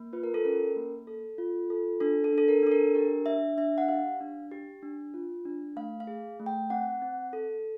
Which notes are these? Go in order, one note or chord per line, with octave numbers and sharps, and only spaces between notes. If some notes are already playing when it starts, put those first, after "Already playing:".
Already playing: A#3
F4 B4
A#4
A4
C#4 A#4
A#3
A4
F4
A4
D4 A4
A4
D4
A4
A#4
D4 A4
A#4
G4 A#4
D4 E5
D4 E5
F#5
G4 F5
D4
G4
D4
F4
D4
A3 F5
F5
G#4
A3
G5
C4 F#5
C4
A4